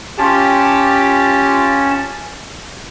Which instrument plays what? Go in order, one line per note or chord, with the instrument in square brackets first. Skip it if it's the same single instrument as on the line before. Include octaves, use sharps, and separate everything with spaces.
[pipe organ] C#4 A5 [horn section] F4 G4